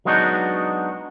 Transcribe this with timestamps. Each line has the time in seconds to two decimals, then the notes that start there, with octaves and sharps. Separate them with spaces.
0.05 F#3 G#3 B3 D4 D#4 F#4